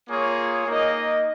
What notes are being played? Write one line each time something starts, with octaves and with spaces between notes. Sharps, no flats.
A#3 F4 G#4 C#5
A#3 D#4 A#4 D#5